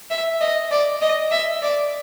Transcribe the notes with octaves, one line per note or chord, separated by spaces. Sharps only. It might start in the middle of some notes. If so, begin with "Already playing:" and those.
E5
D#5
D5
D#5
E5
D5